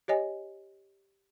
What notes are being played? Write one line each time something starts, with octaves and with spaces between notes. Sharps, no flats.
G4 C#5 D#5 G#5